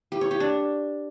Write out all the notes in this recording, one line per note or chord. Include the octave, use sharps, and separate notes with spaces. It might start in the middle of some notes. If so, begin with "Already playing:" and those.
G4
C#5
G4
D4